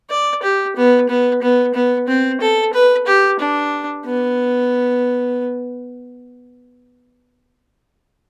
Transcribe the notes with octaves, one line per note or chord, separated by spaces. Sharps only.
D5
G4
B3
B3
B3
B3
C4
A4
B4
G4
D4
B3